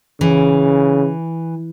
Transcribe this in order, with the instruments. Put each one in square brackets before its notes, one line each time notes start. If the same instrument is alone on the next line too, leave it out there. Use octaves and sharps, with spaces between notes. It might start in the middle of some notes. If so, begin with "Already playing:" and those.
[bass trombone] C#3 [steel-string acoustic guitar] E3